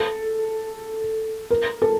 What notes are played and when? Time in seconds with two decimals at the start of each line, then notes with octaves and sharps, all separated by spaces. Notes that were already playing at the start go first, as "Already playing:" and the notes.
Already playing: A4
1.50 A#4
1.82 A4